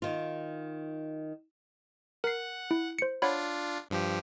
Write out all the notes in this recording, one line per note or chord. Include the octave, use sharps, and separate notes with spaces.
D#3 F4
A#4 F#5 C7
E4
C5 C#7
D4 F4 C#5 F#5 B5
G2 F3 G4